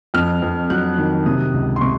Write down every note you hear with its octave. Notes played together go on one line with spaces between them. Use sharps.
F2 F6
F2
F#3 F#6
D#3
C3 D#6
C#2
C6
C3 C#6